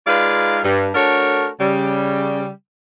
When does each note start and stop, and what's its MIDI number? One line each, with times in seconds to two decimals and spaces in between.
0.07 0.60 56
0.07 0.60 63
0.07 0.60 65
0.07 0.60 71
0.07 0.60 74
0.07 0.60 77
0.64 0.89 43
0.95 1.49 57
0.95 1.49 62
0.95 1.49 66
0.95 1.49 69
0.95 1.49 70
0.95 1.49 73
1.60 2.49 49
1.60 2.49 55